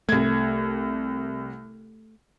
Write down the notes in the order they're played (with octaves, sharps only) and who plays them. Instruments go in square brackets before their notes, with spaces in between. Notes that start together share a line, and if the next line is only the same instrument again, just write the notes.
[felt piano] C2 G#6 [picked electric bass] A3